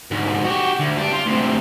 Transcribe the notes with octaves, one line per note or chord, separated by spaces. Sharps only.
D2 G#2
F#4 G4
D2
D4 G4
F4
D2 C3